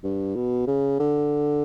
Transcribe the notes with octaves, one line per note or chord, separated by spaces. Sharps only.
G2
B2
C#3
D3